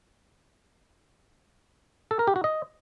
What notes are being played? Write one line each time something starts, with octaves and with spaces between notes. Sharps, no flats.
A4
A#4
G4
F#4
D#5